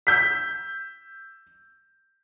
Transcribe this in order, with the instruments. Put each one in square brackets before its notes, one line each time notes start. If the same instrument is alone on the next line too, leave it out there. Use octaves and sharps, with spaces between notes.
[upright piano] E6 G6 B6